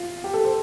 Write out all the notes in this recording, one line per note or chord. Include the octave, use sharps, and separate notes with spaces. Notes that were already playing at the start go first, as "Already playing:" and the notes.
Already playing: F4
G4
A4
C5